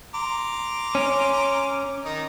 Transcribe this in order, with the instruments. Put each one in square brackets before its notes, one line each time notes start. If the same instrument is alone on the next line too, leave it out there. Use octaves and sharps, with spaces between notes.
[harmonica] A#5 C6 D6
[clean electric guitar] C#4
[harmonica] D#3 D#4